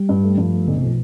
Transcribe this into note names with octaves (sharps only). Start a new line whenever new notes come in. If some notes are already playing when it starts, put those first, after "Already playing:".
Already playing: G3
G2
A3
G2 F3
A3
B1 D3
C3
F3
B2